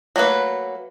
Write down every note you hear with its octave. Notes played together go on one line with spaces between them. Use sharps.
F#3 A3 A#3 B4